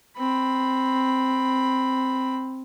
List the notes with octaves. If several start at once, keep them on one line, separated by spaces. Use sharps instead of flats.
C4 B5